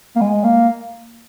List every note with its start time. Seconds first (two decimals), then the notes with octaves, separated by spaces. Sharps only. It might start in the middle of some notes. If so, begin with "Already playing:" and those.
0.16 A#3
0.21 G#3
0.44 A#3